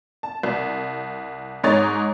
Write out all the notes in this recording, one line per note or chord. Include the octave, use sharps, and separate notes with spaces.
A5
C2
G#2 D#4 C#5 A6